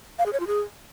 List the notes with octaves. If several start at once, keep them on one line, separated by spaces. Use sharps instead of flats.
F5
G#4
C#5
F4
G#4